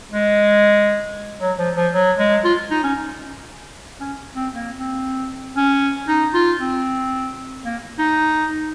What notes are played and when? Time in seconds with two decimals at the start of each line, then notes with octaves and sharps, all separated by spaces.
0.11 G#3
1.41 F#3
1.58 F3
1.76 F3
1.94 F#3
2.18 G#3
2.44 F4
2.71 D#4
2.84 C#4
4.00 C#4
4.35 C4
4.53 A#3
4.79 C4
5.57 C#4
6.08 D#4
6.34 F4
6.60 C4
7.65 A#3
7.99 D#4